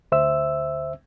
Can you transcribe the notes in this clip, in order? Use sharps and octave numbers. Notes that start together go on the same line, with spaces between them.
D2 C5 E5 E6